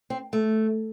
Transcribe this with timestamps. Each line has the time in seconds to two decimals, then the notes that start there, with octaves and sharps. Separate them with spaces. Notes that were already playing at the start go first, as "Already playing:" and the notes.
0.10 C4
0.33 A3